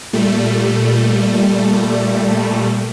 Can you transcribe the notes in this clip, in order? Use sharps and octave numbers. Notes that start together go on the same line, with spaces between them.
A#2 G3 A3